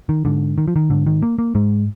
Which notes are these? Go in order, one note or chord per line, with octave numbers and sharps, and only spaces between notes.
D#3
G#2 D3
D#3
F3
D#3
G#2 D3
D#3
A#3
A#3
G#2 G#3